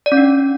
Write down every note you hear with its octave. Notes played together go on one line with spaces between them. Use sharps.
D5
C#4
D4